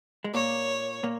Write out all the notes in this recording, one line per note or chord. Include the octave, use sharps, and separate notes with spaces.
G#3
A#2 A#3 C#5
A#2 A#3